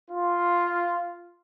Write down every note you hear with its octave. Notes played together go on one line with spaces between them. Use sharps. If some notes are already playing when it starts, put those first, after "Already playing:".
F4